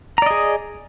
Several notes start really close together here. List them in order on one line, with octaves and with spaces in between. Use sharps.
A#5 D5 D#5 G#4